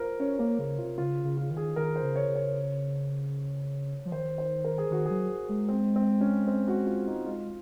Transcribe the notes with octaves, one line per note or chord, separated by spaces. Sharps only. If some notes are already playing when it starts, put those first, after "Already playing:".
Already playing: F4 A#4 C5
C#4 C#5
A#3 A#4
C#3
C3 F4
C#3 F4
C#3
F4
D#3
G#4
D#3 A#4
C5
C#3
C#5
C#3
C#5
F3
D#3 C5
C5
A#4
G#4
D#3 F#4
F#3 G#4
G#3
C4
C4
C#4
C4
F#4
F4
D#4
G#3 F4